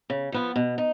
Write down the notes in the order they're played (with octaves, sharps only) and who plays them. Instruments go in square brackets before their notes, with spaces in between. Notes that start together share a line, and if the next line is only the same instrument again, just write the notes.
[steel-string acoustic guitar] C#3
F3 B3 F4
B2
D#4